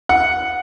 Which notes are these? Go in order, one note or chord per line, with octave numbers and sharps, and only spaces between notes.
F#5